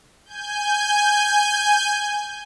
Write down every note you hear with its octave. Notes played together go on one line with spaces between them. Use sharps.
G#5 G6